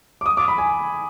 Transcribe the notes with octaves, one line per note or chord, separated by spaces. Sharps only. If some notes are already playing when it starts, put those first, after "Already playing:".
D6
D#6
D6
B5
G#5